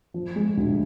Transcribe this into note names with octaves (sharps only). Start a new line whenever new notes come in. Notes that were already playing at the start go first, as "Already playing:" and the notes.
F3
G#3
D2